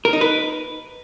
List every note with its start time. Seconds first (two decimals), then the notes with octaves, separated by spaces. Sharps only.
0.05 A#4
0.13 D#4
0.21 B4